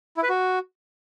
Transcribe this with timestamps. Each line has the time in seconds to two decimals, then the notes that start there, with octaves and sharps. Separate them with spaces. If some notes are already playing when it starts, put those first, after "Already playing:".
0.17 E4
0.23 B4
0.29 F#4